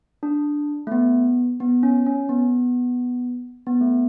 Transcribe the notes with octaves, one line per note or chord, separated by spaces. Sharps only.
D4
A3
B3
B3
C#4
C#4
B3
B3
A3